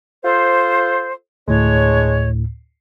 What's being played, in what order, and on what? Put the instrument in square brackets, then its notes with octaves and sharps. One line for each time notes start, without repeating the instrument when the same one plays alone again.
[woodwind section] F4 A4 C5
[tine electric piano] D2 A2 [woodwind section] G#3 D4 C#5